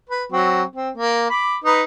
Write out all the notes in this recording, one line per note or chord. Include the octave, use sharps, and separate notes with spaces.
B4
F#3 C4 F#4
C4
A#3
B5 D6
D#4 B4